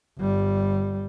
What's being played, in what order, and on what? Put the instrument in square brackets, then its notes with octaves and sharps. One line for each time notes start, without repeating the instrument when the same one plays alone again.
[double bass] G1 G3